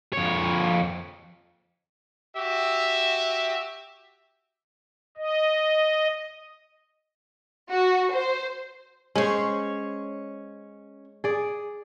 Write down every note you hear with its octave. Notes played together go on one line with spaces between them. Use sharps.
F2 C#5
F#4 G4 E5
D#5
F#4
C5
G#3 C#4 C5 C#5
G#4 D5